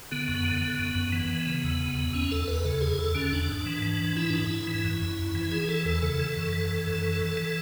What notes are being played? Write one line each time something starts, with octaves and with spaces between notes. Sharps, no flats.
D3 B3
F#2
D3
D3
F#2
F#2
E3
E3
C#3
E2
C#3
E2
E2 C#4
E2 A4
E2 B4
C#3 A4
E2 G#4
E2 A4
D3 C#4
E2 D4
G#2
E3
E3
G#2
E3 E4
G#2 D4
E4
G#2
E3
F#2
F#2
F#2
E3
E3 G#4
E3 A4
E2 A4
C#3 A4
E3
F#2
E3
E3
F#2
E3
E3
E3